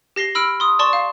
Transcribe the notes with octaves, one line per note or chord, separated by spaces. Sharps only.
G4 A#6 C7 G7
B5 E6 F6 D7
C6 D#6
D5 A5 C6 C#6
F5